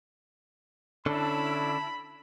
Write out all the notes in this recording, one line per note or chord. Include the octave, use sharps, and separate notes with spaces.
D3 C#4 D4 E4 A5 B5